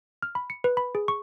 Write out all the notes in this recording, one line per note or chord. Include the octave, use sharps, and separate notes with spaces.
F6
B5
C#7
B4
B5
G#4
C#6